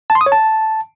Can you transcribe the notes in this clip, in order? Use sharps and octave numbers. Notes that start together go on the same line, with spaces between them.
A5
C6
D#6
C#5
A5